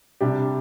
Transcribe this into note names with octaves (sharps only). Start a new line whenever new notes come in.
C3 G3 D4 G4